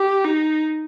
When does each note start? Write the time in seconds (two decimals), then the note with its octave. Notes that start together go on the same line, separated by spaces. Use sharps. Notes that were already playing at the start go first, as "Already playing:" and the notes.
Already playing: G4
0.24 D#4